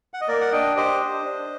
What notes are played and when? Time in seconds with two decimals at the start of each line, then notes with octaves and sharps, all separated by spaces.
0.14 F#5
0.21 D#5
0.28 A#3 A#4 D5
0.41 F#5
0.52 D4 D#5 G5
0.76 G4 C5 D#5
1.01 D4
1.25 D4